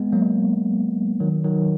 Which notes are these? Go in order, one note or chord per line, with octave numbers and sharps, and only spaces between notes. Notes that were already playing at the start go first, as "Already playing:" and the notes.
Already playing: G#3 B3
F#3 A#3
D#3 F#3
D#3 F#3